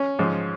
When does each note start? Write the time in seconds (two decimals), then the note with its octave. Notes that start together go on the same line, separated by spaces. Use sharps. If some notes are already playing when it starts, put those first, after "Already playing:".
Already playing: C#4
0.19 G#2 F3